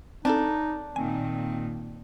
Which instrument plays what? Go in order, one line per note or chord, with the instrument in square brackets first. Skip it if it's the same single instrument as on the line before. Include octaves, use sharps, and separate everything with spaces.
[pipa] C#3 D4 [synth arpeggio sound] C4 A4 [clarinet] D#4
[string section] A#2 D#3 [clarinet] C4 [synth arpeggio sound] G#5